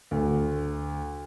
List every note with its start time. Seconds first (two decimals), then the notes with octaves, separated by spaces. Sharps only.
0.11 D2